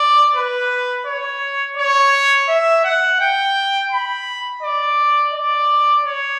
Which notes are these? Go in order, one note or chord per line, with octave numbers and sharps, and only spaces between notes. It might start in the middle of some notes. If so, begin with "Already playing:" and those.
Already playing: D5
B4
C#5
C#5
E5
F#5
G5
B5
D5
D5
C#5